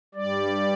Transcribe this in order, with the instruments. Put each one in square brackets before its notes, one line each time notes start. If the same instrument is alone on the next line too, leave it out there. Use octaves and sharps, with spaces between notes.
[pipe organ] G2 G3 D5